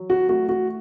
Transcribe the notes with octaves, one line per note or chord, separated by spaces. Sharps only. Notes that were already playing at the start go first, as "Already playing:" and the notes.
Already playing: F#3
F#4
A3 F#4
F#4